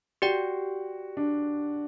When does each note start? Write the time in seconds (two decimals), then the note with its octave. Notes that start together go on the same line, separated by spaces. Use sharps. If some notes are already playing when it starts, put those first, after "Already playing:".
0.22 F#4 G4 D5 G5
1.17 D4